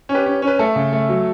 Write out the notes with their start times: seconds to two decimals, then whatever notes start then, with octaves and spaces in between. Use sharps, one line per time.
0.09 C#4
0.14 G4 B4
0.26 C#4
0.42 C#4
0.47 B4
0.59 A3 A4
0.76 C#3
0.93 A3
1.09 F#3